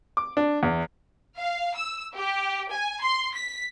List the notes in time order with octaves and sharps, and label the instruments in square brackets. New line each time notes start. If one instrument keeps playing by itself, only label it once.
[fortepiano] D6
D4
E2
[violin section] F5
E6
G4
G#5
C6
B6